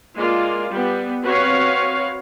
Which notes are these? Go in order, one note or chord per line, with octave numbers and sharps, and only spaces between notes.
G#3 A#3 F4 D5
G3 B3
C4 F#4 B4 C#5 F5